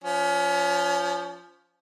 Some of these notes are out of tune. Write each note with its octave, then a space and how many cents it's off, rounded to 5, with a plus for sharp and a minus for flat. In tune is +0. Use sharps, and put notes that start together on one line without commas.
F3 +0 C#4 +30